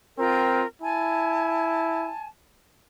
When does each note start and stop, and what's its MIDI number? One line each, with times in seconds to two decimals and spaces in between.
0.19 0.63 60
0.19 0.66 65
0.19 0.66 70
0.19 0.66 79
0.82 2.12 64
0.82 2.27 80
0.82 2.27 81